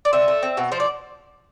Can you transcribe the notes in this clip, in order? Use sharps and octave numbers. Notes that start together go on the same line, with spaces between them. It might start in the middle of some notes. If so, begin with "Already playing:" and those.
D5
C4 E5
A3
C4
B2
F3 C5
D5